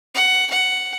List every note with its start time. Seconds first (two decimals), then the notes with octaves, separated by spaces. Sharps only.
0.15 F#5
0.51 F#5